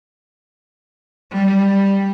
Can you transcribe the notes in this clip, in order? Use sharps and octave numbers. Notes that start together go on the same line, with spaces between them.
G3